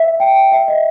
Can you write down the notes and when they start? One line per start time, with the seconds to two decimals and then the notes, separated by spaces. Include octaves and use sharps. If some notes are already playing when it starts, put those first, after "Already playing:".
Already playing: E5
0.20 G5
0.52 E5
0.68 D#5